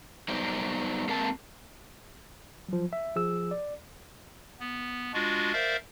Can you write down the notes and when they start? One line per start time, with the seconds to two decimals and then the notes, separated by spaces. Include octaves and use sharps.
0.28 F#3 G3 B3 D#4 C5 D5
1.08 G#3 A#3 C4 A5
2.69 F3 F#3
2.93 E5
3.16 F3 G#4 E6
3.51 D5
4.60 B3
5.14 G#3 D4 F4 F#4
5.53 A#4 C5 D5 E5 F5